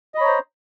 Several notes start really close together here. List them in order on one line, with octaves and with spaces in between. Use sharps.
D#5 B5 C#5 A#5 C5